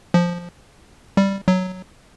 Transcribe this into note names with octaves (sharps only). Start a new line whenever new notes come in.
F3
G3
F#3